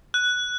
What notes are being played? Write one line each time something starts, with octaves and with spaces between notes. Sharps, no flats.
F#6